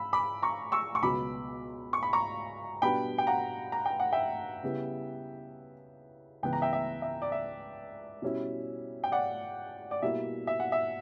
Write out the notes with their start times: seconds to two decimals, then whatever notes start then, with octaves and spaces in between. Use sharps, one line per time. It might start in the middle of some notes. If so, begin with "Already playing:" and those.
Already playing: B5 E6
0.13 B5 D6
0.43 A#5 C#6
0.72 C#6 E6
0.95 C#6
1.02 C#2 B2 F#3 B3 B5 D6
1.93 C#6
2.03 B5
2.13 A#5 C#6
2.82 B2 G3 B3 D4 G5 B5
3.18 G5
3.27 F#5 A#5
3.72 A#5
3.86 G5
4.00 F#5
4.12 E5 G5
4.63 C#3 G3 B3 E4
6.43 C#2 C#3 E3 B3 G5
6.53 A#5
6.62 E5 G5
6.73 E5
7.02 E5
7.22 D5
7.32 E5
8.22 B2 G3 C#4 E4
9.04 G5
9.12 D5 F#5
9.91 D5
10.02 B2 G3 A#3 E4 E5
10.47 E5
10.60 F#5
10.72 E5